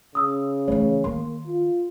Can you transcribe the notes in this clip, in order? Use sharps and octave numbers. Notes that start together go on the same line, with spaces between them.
C#3 D#6 E6
E3 A3 C#5
D#3 A#3 C6
F4